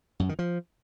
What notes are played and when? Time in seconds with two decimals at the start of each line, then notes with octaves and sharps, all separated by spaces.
0.20 F#2
0.29 D#3
0.39 F3